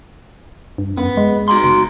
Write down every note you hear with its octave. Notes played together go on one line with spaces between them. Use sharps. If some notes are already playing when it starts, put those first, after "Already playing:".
G2
F#2 B3
G#3
F#4 A#5 C6
F#1